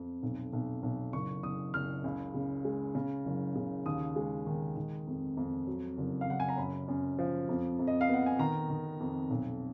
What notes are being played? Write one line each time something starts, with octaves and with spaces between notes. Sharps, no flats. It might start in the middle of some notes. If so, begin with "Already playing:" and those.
Already playing: F2
B1
B1
B1
F#1 C#6
F#1 D#6
F#1 F6
C#2
C#3
G#3
C#3
F#1
C#3
D#2 D#6
G#3
D#3
D#3
F2
F2
F#3
F#1
F5
F#1 F#5
G#5
A#5
F#2 B5
F#2
F3
F2
F2
D#5
F5
B3 F#5
G#5
D#3 A#5
D#3
F2
B1